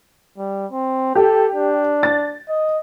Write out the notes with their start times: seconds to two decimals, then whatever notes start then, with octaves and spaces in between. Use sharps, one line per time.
0.38 G3
0.72 C4
1.15 G4 A4
1.55 D4
2.03 A6
2.49 D#5